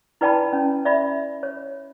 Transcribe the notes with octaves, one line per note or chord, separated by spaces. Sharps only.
E4 B4 D5 G5 A5 B5
C#4
D5 E5 B5
C#5